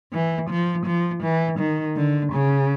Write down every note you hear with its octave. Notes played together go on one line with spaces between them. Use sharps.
E3
F3
F3
E3
D#3
D3
C#3